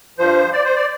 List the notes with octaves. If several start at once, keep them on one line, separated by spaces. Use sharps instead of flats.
G2 F3 C5
D5
C5
D5